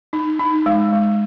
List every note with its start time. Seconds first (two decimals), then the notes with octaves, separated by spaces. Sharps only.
0.13 D#4
0.39 D#4
0.66 G#3
0.92 G#3